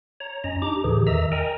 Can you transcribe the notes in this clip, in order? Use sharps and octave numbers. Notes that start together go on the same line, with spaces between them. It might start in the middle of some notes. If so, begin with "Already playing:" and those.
C#5 A#5
F#2 C#4 D#5 A#5
D4 D#4 G4 A#5 D6
D#2 A2 D3 E3 G4 G#4
E2 D#3 D#5 E5 A#5 E6
A#4 D#5 G5 G#5 A#5